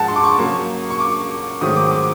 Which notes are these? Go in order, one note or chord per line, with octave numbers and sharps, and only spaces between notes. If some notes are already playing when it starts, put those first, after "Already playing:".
Already playing: G#2 F3 G#3 F#5 A5
C6
D6
C#6
C#3 F#3 A#3
C#6
D6
G#2 D#3 F#3 A3 C4 D#6
D6
D6